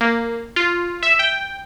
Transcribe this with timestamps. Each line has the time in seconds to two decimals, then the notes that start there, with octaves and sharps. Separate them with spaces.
0.01 A#3
0.56 F4
1.03 E5
1.19 G5